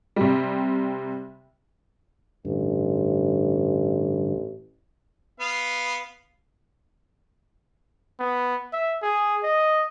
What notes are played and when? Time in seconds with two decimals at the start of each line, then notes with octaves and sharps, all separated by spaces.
0.16 C3 G3
2.45 A1 G2 D3
5.40 B3 F5
8.19 B3
8.73 E5
9.02 G#4
9.43 D#5